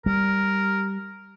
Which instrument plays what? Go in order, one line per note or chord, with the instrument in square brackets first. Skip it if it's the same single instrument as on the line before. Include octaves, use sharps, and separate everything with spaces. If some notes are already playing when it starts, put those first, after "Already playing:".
[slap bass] G3 [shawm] A#4